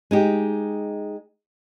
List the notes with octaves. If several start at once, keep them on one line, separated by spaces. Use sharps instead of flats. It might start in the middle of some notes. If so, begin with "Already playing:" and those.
G#3 D#4 G4